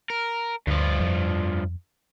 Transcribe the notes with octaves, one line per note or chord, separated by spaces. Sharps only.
A#4
D2 G2 F3
F2